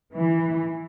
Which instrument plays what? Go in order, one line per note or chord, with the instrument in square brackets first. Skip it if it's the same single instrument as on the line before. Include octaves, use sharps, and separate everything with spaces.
[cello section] E3